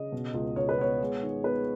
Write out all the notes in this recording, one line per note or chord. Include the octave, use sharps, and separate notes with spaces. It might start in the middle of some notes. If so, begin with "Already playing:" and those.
Already playing: C#3 D#5
B2
C#2
C#2 C#5
B4
B3 C#5
G#3
D#3
B3 B4